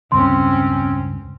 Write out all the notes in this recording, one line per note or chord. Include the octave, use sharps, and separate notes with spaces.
E1 C#2 G2 C4 C#4 C6